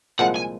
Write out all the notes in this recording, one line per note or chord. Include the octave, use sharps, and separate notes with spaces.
C2 A#2 F3 G#3 F#5
G#5